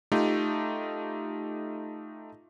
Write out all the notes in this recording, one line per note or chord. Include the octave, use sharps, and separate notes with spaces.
A3 D#4 F4 G4